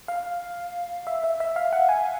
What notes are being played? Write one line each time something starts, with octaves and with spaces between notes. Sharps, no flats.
F5
E5
E5
E5
F5
F#5
G#5